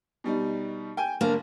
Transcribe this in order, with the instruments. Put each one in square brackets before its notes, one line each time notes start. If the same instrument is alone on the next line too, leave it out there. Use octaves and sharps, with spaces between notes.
[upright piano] B2 G3 D#4
G5 G#5
[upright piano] G1 [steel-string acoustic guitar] A#3 D4